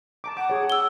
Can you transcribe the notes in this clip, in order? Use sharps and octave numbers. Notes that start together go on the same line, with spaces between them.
A5 A#5 D6
F#5 D6
G#4 C#5
E6 G7